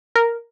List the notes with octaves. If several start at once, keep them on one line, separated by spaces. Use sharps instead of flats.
A#4